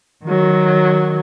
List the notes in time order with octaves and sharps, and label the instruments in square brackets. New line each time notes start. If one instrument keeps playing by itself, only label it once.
[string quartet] D#3 F#3